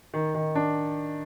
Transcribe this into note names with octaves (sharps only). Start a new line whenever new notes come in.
D#3
D#3
D4